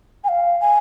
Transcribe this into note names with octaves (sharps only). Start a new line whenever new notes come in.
G#5
F5
G#5